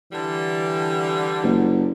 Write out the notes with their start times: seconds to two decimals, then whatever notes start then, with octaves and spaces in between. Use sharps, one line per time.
0.12 D3 E3 G3
1.43 F#1